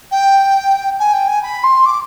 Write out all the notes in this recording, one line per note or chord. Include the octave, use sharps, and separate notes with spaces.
G5
G#5
G5
G#5
B5
C6
D6